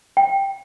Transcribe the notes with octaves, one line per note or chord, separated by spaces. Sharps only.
G5